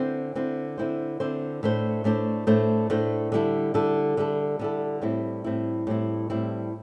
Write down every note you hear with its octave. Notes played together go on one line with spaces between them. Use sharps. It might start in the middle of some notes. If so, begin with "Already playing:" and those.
Already playing: D3 C4 E4 C5
D3 C4 E4 C5
D3 C4 E4 C5
D3 C4 E4 C5
A2 A3 D4 C5
A2 A3 D4 C5
A2 A3 D4 C5
A2 A3 D4 C5
D3 G3 E4 A4
D3 G3 E4 A4
D3 G3 E4 A4
D3 G3 E4 A4
A2 G3 C4 E4
A2 G3 C4 E4
A2 G3 C4 E4
A2 G3 C4 E4